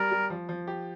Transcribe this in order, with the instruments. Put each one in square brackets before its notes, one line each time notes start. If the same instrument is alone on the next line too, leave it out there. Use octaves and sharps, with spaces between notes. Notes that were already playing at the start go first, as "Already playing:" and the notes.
Already playing: [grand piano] G3 [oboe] A#4
[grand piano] G3
F3
F3
G4